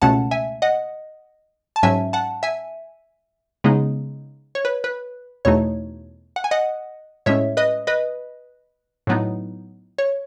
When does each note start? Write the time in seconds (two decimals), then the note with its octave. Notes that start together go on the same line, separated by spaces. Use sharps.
0.02 C#2 B2 A3 C#4 F#5 A5
0.31 E5 G#5
0.62 D#5 F#5
1.76 A5
1.83 G#2 F#3 C#4 E5 G#5
2.13 F#5 A5
2.43 E5 G#5
3.64 C#3 G#3 B3 D#4
4.55 C#5
4.65 B4
4.84 B4
5.45 E2 B2 A3 D#4 C#5
6.36 F#5
6.44 G#5
6.51 D#5 F#5
7.26 A2 G#3 C#4 C#5 E5
7.57 B4 D#5
7.87 B4 D#5
9.07 A2 F#3 B3 D#4
9.98 C#5